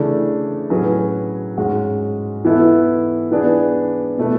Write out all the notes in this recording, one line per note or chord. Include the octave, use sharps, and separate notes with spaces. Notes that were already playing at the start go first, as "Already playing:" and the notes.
Already playing: C#3 E3 A3 D4
A2 F#3 C#4 G#4 B4
G#2 G#3 C#4 F#4
E3 B3 E4 A4
E3 B3 D4 G#4
B2 A3 E4 B4